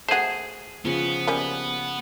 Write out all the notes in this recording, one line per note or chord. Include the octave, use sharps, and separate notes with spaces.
A3 F#4 G#4 C5
C#3 F3 B3
G3 A#3 C#4